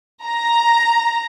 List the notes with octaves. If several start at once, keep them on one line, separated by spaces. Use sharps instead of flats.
A#5